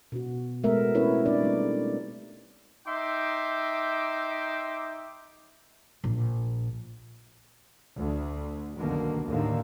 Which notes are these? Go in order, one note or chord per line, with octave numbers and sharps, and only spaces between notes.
B2 F#4
G#3 A3 B3 A#4 E5
C4 C#4 E4 A#4 B4 C#5
D4 D#4 D5
G3 A3
D#4 E5 G5 C6 D6
A#1
D2
C2 F#2 B2 D3 D#3 A#3
D#2 A2 D3 D#3 A#3